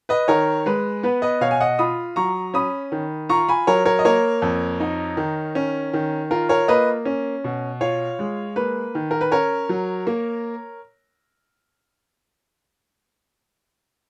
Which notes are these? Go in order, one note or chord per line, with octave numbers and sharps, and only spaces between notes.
B4 D#5
D#3 A#4 C#5
G#3 B4
B3 B4
B4 D#5
B2 C#5 F5
G#5
D#5 F#5
F4 B5 D#6
F#3 A#5 C#6
C#4 B5 D#6
D#3
F4 A#5 C#6
G#5 B5
F#3 A#4 C#5
A#4 C#5
D#5
A#3 A#4 C#5
F2
D#4
D#3
C#4
D#3
F4 A#4
A#4 C#5
A#3 B4 D#5
C#4
B2
F4 C#5 F5
G#3
A#3 B4
D#3
A#4
B4
C#4 A#4 C#5
F#3
A#3